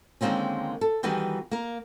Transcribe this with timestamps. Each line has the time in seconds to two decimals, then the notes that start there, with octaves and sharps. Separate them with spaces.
0.21 D3 D#3 G#3 A#3 C4 C#4
0.81 A4
1.03 D#3 E3 G3 B3 F#4 G#4
1.51 A#3 A#4